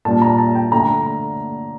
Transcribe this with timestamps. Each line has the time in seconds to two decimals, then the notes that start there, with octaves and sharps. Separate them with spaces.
0.05 A#2 G3 D4 A5
0.22 A#5
0.39 A5
0.55 G5
0.72 D3 A3 D4 A#5